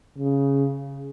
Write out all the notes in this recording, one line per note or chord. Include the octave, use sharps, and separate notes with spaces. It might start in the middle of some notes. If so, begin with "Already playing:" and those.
C#3